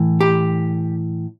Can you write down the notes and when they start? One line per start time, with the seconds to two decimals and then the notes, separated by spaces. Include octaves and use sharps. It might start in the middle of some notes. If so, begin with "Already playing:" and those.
Already playing: A2 E3
0.21 G4